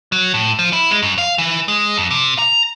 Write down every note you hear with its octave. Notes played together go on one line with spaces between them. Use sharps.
F#3
A2
F3
E4
G#3
F#2
F5
E3
G#3
F2
C3
A#5